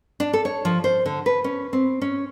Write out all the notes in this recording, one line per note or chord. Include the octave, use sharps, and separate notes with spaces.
D4
A4
C#5
F3
C5
D3
B4
C#4
C4
C#4